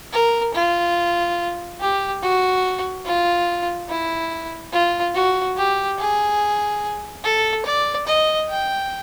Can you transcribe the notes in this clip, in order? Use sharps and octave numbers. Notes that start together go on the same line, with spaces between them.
A#4
F4
G4
F#4
F4
E4
F4
F#4
G4
G#4
A4
D5
D#5
G5